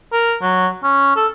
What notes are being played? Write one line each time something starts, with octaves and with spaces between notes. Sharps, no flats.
A#4
F#3
C#4
A4